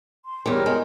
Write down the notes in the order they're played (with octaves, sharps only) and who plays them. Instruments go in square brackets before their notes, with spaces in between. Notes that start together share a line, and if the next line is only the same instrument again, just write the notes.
[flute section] C6
[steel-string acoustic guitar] E2 G3 [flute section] G4 A#4 C#5
[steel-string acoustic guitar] G#3